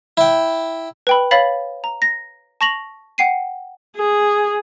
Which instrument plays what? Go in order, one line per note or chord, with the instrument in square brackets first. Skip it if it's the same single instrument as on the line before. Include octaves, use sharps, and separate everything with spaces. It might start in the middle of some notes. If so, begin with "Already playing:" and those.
[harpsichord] E4 G5
[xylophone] B4 G5 B5
C#5 F5 B5 A6 B6 F#7
A#5
A#6
A5 C#6 A#6 F7 F#7
F#5 G5 C7 D#7
[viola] G#4